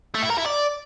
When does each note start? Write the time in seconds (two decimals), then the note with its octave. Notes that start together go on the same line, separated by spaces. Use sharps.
0.15 A3
0.23 E4
0.30 A#4
0.38 E4
0.46 D5